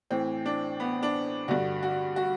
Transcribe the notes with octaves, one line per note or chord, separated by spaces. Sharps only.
A2 E3 C4
D4
B3
D4
G2 D3 F#4
F#4
F#4